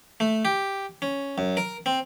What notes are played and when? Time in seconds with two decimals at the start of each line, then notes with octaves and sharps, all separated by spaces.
0.20 A3
0.45 G4
1.02 C#4
1.38 F#2
1.57 A#4
1.86 C4